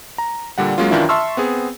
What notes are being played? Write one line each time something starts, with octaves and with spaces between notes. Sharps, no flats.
A#5
A#2 D3 G3 F#5
F#3 G#3 A#3 C#4 F4
F#2 D#3 E3 D4 E4 F4
E5 A5 C6 C#6 E6 F6
B3 C4 G#4